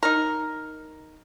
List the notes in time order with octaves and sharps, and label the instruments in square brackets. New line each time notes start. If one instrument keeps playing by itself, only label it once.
[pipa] D#4 A#4